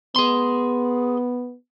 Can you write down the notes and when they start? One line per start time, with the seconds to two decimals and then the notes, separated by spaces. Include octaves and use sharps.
0.16 B3 G#4 C6